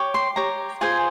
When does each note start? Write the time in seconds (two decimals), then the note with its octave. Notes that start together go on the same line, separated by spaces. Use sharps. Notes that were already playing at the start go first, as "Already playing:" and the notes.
Already playing: G4 C#5
0.14 C6
0.36 G4 C#5 A#5
0.81 F4 G#4 C5 G#5